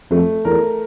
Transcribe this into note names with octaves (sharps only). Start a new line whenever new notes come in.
F2 A3
E2 A#4